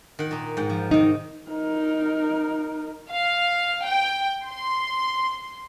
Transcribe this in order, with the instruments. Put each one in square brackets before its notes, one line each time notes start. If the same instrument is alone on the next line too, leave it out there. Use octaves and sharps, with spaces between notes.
[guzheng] D#3 F#5
A#2 D#4
G#2 G5
F3
[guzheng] C3 D#3 [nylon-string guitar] D#4
[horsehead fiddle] D#4 A#4
[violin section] F5
G5
C6